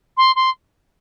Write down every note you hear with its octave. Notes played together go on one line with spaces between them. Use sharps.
C6
C6